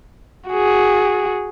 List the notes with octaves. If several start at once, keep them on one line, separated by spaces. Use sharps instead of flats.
F#4 G#4